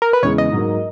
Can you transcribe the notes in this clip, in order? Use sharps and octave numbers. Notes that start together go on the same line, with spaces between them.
A#4
B4
E2 C#3 G#3 C#5
D#5
G#2 F#3 A#3